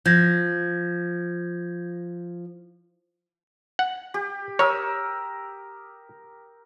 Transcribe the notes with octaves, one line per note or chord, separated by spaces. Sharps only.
F3 G6 G#6 A#6
F#5
G4
A#4 C#5 D#6 E6